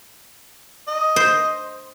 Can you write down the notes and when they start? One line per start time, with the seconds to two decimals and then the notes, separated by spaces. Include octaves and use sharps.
0.88 D#5
1.16 C5